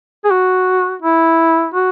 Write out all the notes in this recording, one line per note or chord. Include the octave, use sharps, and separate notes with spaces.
G#4
F#4
E4
F#4